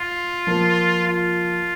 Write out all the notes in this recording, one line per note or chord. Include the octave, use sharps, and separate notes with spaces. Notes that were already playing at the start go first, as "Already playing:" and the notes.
Already playing: F4
F3 A#3
F4